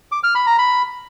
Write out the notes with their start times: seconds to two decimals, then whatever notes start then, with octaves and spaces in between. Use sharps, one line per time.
0.12 D6
0.23 F6
0.35 B5
0.47 A#5
0.58 B5